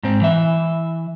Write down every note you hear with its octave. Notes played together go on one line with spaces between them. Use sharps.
G#2 C4
E3 E5